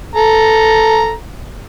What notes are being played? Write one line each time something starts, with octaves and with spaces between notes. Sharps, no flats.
A4 A#5